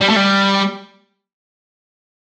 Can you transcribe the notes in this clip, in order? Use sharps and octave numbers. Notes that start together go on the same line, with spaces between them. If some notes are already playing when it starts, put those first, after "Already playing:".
G3
A3
G3